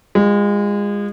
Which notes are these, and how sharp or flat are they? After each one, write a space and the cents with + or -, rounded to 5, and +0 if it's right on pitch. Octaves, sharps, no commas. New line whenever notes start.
G#3 -30 F4 +0